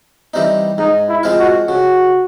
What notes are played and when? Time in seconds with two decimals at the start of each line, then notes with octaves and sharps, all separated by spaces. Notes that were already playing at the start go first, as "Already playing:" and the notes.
0.34 E3 G3 C4 D#4
0.78 G#2 D#4
1.09 E4
1.23 F3 G#3 C4 F4
1.39 F#4
1.68 C#3 F#4